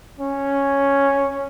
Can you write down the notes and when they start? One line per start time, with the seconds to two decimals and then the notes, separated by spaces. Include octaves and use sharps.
0.20 C#4